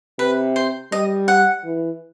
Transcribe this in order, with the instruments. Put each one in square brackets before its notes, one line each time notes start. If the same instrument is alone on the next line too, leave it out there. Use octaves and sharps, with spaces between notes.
[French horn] C3 [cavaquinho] B4
[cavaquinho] C5
[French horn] G3 [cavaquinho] D#5
[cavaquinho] F#5
[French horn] E3